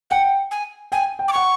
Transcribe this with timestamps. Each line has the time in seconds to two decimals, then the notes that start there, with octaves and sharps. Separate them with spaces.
0.10 F#5 G5
0.51 G#5
0.92 G5 G#5
1.19 G5
1.28 D6
1.33 F#5 C#6